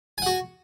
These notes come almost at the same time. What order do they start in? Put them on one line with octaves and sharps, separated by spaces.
G#5 F#5 F#4